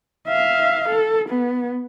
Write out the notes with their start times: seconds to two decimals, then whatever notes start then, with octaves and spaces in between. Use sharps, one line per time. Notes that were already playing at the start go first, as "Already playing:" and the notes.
0.28 E5 F5
0.89 A4
1.29 B3